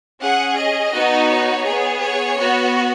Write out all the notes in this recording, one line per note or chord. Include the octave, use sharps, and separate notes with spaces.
C#4 G#4 F#5
D#5
B3 D#4 F#4
C#5
B3 G#4
C#5
B3 F#4